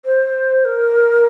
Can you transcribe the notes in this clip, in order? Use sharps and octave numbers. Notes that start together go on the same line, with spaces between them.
C5
A#4